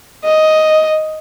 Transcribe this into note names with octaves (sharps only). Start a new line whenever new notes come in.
D#5